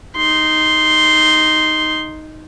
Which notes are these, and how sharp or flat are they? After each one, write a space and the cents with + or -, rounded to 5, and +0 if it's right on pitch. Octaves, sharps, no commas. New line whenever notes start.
D#4 +0 C6 +0